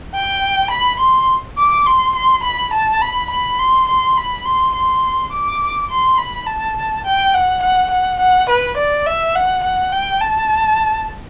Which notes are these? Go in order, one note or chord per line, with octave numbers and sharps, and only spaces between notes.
G5
B5
C6
D6
C6
C6
B5
A5
B5
B5
C6
C6
B5
C6
C6
D6
C6
B5
A5
G5
F#5
F#5
F#5
F#5
B4
D5
E5
F#5
F#5
G5
A5